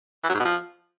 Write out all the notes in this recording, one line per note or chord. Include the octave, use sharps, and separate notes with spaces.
E3
F#3
G#2
B2
F3